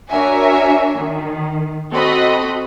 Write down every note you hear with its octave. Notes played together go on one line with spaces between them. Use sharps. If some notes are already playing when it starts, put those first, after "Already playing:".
D4 F#4 A#4 C#5 E5 G#5
D#3
C4 F#4 A4 D#5 B5